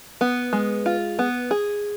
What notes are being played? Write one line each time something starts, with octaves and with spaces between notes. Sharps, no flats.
B3
G#3
F4
B3
G#4